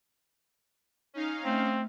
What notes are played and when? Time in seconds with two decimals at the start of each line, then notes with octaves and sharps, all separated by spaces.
1.14 C#4 D#4 F5
1.45 A3 C4